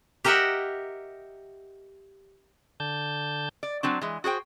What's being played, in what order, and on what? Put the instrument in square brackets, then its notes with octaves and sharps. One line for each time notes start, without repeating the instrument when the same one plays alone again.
[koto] G4 A#4 D#5 E5 F#5 G5
[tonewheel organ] D3 A5 G6
[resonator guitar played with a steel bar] D5
F#3 C4 D4
E3 G#3
F#4 G#4 C5 G5